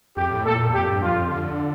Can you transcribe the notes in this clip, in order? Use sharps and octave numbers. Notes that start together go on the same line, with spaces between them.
F2 G4
A2
A#2 A4
E2
G4
F2
G2
F2 F4
F2
D3